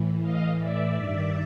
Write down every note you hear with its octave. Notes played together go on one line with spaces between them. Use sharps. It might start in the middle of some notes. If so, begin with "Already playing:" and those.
Already playing: A2 E3
D#5 F5
D5 E5
G2 D#3